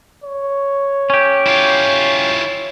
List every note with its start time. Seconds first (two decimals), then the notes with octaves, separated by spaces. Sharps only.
0.24 C#5
1.10 C#4 G4
1.47 E4 F4